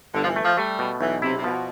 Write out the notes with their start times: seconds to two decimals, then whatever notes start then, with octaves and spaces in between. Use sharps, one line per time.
0.14 G1 D3
0.23 F3
0.28 E3
0.36 A3
0.43 F3
0.57 G3 A3
0.79 B2
1.00 B1 E3
1.22 C3 E4
1.35 C3
1.44 B2 F3